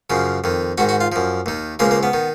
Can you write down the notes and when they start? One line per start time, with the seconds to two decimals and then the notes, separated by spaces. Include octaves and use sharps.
0.10 F#2 C#3 F3
0.44 F2 D#3
0.78 G#2 D#3 F#4
0.89 F#4
1.01 F4
1.12 F#2 F3
1.46 D#2 D#3
1.79 C#2 C#3 F3 A#3
1.91 A#3
2.03 B3
2.13 D#3